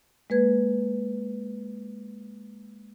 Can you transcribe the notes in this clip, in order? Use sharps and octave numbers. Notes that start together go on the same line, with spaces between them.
G#3 A#3 B4 G#6